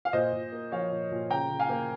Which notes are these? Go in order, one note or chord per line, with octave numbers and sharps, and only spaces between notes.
F5
A#2 C5 D#5
A#2
A#3
F3 C#5 F5
A#2
A#2
C#3 G5 A#5
C#3
F5 G#5
A#3